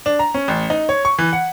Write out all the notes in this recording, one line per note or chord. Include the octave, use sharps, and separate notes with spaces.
D4
A#5
C#4
A1
D#4
C#5
C#6
E3
F#5